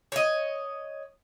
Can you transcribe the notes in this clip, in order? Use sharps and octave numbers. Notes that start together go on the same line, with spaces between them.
C#5 D#5